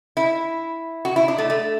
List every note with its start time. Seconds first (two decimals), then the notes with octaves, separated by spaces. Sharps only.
0.17 E4
1.05 F#4
1.16 E4
1.28 D4
1.38 A3
1.50 A3